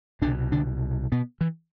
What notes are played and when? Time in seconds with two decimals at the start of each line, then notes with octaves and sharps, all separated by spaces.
0.22 C2 B2 D3 D4
0.52 D3 D4
1.12 B2 B3
1.41 E3